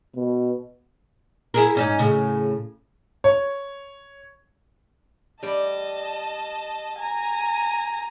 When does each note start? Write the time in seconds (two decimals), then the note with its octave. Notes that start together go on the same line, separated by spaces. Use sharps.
0.16 B2
1.54 E4 G#4 A#4
1.75 G#2 C#4 D#4
1.99 A2 C#3
3.24 C#5
5.43 G3 D5 D#5 A5
6.98 G#5 A#5